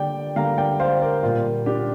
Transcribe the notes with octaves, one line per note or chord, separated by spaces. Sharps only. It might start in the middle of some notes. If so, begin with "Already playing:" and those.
Already playing: D3 G3 A#3 D5 G5
D3 G3 A#3 F5 A#5
D5 G5
C5 F5
A#4 D5
A#2 G3 A#3 F4
D4 G4